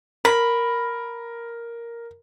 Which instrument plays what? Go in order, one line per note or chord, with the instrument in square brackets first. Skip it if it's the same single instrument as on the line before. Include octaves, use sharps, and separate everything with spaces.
[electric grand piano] A#4 [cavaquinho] B5